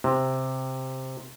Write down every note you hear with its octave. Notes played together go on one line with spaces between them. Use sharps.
C3